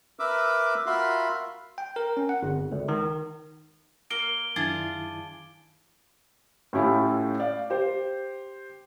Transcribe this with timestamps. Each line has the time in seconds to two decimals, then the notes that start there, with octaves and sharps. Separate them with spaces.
0.19 A#4 B4 E5 D6 E6
0.86 F4 F#4 A#4 E5 B5 C6
1.78 G5
1.96 A#4
2.17 C#4
2.29 F#5
2.43 G1
2.72 C#2
2.88 D#3
4.10 A#3 D7 G7
4.56 F#2 D#3 D4 E4 F4 G#4
6.73 A2 A3 C#4 E4 F4 G4
7.40 D5 F5
7.70 G4 C5